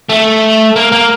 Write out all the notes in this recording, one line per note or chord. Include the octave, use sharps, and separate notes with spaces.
A3
A#3
A#3